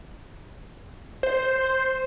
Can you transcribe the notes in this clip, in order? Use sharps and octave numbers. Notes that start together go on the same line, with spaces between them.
C5